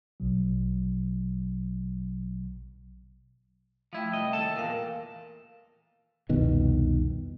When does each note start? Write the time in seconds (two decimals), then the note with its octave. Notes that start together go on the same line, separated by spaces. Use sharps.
0.20 A#1 B2 F#3
3.93 F3 A3 E4 E5 G5
4.13 C2 D#5
4.33 D#2 A4 A5
4.56 E2 A#2 A#4 F5
6.29 C2 F2 B2 D#3